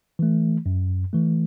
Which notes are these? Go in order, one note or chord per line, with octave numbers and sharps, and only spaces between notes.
E3 A3
F#2
E3 A3